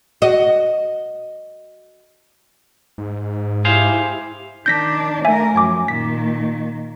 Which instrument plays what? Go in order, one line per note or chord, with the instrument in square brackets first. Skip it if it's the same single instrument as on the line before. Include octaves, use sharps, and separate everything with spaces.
[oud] F#4 D#5
[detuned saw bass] G#2
[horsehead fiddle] E4 G4 [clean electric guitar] G#4 C5 F5
[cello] D#3 D4 [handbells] G6 A#6 B6
[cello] A3 A#4 [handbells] E5 G#5
[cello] F#2 F3 [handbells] G#5 D6
[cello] A#2 D#3 [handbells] B6